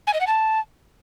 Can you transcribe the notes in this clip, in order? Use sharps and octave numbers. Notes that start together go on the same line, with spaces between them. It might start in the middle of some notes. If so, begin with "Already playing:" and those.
G#5
D#5
F#5
A5